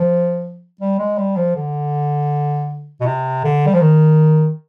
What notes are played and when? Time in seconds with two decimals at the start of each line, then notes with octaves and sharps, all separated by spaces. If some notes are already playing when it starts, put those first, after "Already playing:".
Already playing: F3
0.81 G3
0.99 G#3
1.18 G3
1.37 F3
1.56 D3
3.01 B2
3.06 C3
3.44 D3
3.67 G3
3.74 F3
3.81 D#3